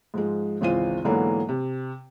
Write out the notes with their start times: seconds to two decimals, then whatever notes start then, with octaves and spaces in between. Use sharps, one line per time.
0.14 G#2 F3 G#3
0.61 G#1 C#2 E3 F4 C5 D#7
1.05 G#2 D3 E3 F#3 A#3 B3
1.49 C3